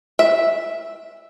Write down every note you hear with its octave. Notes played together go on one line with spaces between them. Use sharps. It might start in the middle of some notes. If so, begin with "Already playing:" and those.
E5